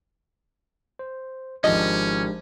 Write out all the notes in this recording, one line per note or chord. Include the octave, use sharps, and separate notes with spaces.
C5
G#1 F3 G#3 C#4 D4 G4 D#5